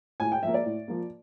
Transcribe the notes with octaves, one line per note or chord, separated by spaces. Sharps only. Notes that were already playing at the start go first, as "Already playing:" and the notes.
A2 G#5
G5
F3 A#3 E5
D5
A2
F3 A#3